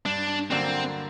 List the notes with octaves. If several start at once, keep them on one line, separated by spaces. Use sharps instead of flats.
G2 D4
D3 F#3 A#3 C4 D4